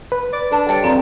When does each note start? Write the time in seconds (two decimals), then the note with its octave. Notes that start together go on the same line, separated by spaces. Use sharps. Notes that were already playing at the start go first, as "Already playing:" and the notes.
0.12 B4
0.33 D5
0.52 D4 A4
0.69 G3 A4 C#5 D5
0.84 F2 C4 A#4